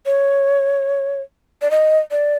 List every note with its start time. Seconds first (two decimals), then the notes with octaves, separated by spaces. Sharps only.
0.06 C#5
1.62 D5
1.71 D#5
2.11 D5